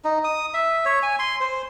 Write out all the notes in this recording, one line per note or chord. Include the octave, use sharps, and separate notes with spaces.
D#4
D#6
E5
C#5
G#5
C6
C5